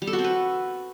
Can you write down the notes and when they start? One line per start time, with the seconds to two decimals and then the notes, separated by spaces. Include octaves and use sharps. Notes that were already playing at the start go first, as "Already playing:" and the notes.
0.02 G3
0.07 A4
0.13 F#4
0.19 C4
0.24 B4